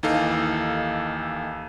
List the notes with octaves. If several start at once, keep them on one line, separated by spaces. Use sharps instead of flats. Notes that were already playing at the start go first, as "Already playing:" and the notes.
D#2 E3 D#4 A4 F5